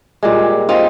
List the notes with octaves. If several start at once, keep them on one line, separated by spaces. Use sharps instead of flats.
A#2 G3 G#3
C4 D#4 F4